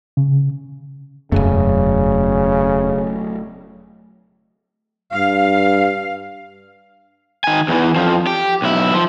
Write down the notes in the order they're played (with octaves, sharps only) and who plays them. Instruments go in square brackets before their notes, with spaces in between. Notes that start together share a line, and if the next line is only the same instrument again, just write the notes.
[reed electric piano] C#3
[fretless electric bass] E1 F#2 [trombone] C#3 [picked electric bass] F#3 A3
[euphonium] G2 [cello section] F5
[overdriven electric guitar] D#3 G#5
E2 E3
F2 F3
G4
B1 E4
F3